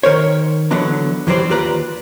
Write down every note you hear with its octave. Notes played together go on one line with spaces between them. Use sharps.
D#3 A#4 C5 C#5
D3 E3 F#3 B3 D4 A#5
E2 E3 F#3 G3 C5 D5
D#2 F4 G4 B4 D5 A#5